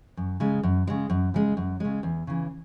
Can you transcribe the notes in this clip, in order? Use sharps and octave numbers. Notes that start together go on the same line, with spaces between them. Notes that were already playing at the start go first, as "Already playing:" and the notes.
F#2
C#3 G#3
F#2
C#3 G#3
F#2
C#3 G#3
F#2
C#3 G#3
E2
C#3 E3